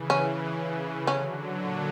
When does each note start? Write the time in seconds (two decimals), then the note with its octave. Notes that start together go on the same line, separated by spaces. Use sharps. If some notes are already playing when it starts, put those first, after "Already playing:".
Already playing: C#3 E3
0.10 C#4
1.07 D3 F#3 C#4
1.57 A#2